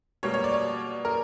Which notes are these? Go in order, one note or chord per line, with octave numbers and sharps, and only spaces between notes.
B2 G3 A#3 C#5
C#5
D5
C#5
A#4